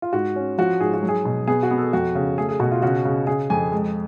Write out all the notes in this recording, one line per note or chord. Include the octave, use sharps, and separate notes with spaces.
F4
G#2 F#4
C#4
F3 F#4
G#2 G#4
F#4
F#3
G#4
B2
B3 G#4
F#4
B3
A4
F2 F#4
C#3
A3 G#4
G#4
B2 F#4
F4
C#3 F#4
C#3
C#3 G#4
F2 G#5
G#3